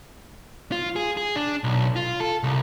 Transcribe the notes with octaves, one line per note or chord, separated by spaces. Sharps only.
F4
G#4
G#4
D4
B1
F4
A4
C2